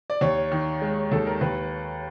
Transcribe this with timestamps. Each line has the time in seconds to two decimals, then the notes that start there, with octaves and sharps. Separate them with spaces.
0.10 D5
0.21 D#2 C#5
0.51 D#3
0.82 G#3
1.12 D#2 A4
1.27 A#4
1.41 D#2 B4